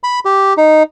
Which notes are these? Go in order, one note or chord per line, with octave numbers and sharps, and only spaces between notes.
B5
G4
D#4